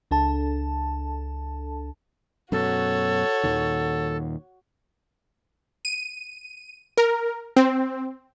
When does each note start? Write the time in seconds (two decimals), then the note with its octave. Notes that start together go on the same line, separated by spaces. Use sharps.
0.11 C#2 D4 A4 A5
2.52 F#2 B2 F#4 A4 C#5
3.44 D#2 A#2 D#3
5.85 D#7
6.97 A#4
7.56 C4